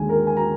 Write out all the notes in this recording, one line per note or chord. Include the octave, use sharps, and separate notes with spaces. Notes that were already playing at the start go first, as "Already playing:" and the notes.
Already playing: D#2 D3 G#3 G#5
A#4
G#5
A#5